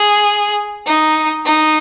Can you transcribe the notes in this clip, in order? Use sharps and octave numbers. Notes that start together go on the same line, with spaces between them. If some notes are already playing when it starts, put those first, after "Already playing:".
Already playing: G#4
D#4
D#4